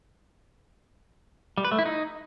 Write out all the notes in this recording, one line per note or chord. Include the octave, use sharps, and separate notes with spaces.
G3
B4
A3
E4
D#4